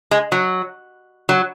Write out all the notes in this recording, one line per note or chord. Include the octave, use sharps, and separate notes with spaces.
G#3
F#3
F#3